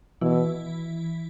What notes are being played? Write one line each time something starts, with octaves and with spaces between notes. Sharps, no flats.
B2 E3 E4